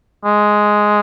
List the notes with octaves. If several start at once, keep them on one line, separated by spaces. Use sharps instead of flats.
G#3